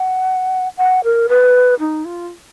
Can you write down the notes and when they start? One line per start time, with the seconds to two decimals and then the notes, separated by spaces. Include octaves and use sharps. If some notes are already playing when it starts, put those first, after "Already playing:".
Already playing: F#5
0.77 F#5
1.04 A#4
1.29 B4
1.80 D#4
2.05 F4